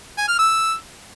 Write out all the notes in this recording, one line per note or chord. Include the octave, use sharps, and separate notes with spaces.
G#5
F6
E6